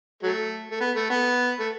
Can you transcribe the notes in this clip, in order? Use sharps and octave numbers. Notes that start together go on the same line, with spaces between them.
F#3 A3
A3
B3
A3
B3
A3